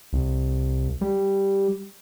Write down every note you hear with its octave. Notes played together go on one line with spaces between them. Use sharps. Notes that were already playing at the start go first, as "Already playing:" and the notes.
C2
G3